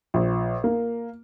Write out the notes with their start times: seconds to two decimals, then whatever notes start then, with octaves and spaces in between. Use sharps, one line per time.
0.14 A#1
0.64 A#3